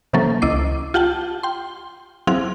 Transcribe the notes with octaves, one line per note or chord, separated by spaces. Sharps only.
C3 E3 F#3 A#3 C#4 A4
C#2 E4 D#5 D6 C7
F4 G4 F#5 G5 A5
G5 C6
F#3 C4 E4 G#4 F5 F#6